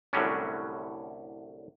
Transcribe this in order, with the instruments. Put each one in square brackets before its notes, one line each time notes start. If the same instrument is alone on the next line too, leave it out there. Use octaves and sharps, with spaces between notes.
[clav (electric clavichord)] C2 A2 D3 F#3 G3 C#4